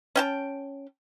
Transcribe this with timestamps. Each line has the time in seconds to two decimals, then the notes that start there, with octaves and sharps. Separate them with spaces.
0.16 C#4 G5 A5